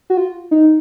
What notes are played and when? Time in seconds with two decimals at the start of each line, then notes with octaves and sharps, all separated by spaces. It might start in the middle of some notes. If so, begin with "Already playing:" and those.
0.10 F#4
0.17 F4
0.51 D#4